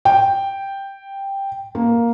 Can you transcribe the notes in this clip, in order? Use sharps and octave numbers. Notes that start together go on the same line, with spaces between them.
G5
A#3